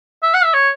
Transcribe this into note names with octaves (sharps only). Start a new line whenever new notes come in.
E5
F#5
E5
C#5